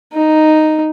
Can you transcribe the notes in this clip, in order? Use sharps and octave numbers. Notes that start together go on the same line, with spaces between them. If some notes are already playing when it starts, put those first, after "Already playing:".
D#4